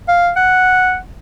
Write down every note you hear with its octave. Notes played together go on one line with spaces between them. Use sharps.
F5
F#5